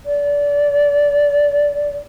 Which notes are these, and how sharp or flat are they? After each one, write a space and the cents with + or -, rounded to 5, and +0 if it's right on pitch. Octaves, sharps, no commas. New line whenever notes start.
D5 -25